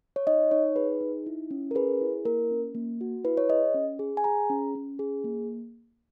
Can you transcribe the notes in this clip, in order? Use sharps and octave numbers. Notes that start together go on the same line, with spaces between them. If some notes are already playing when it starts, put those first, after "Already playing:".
C#5
D#4 D#5
D#4 C#5
G#4 B4
D#4
E4
C#4
A#4
G#4 B4
E4
A#3 A#4
C#4
A#3
F#4
E4 B4
C#5
G#4 D#5
C#4
G#4
G#5
G#4 A#5
C#4
C#4
G#4
A#3